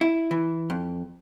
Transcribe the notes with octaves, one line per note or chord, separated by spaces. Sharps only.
E4
E3
F2